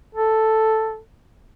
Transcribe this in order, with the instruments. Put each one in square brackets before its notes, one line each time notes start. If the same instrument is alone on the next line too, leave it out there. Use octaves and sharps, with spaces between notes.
[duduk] A4